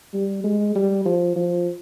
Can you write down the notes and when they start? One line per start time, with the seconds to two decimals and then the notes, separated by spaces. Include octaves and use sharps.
0.14 G3
0.44 G#3
0.75 G3
1.06 F3
1.36 F3